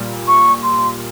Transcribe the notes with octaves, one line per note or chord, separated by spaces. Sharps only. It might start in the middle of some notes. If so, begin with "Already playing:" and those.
Already playing: A#2 G3 A#3
C#6
C6